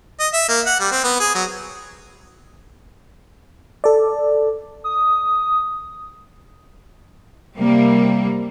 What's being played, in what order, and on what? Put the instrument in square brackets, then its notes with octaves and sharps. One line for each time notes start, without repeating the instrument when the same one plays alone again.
[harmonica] D#5
E5
A#3
F#5
G3
C4
B3
G#4
F#3
[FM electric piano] A4 D5
[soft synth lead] D#6
[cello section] C3 G3 A#3